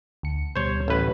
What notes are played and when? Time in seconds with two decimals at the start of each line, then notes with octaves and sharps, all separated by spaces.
0.23 D2 C#7
0.56 D2 B2 G3 C5 C#5
0.88 A1 B4